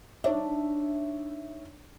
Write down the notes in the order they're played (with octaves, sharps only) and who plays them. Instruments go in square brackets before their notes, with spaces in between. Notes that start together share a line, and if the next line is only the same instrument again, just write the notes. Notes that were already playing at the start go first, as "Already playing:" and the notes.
[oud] D4 [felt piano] D#4 C#5 E5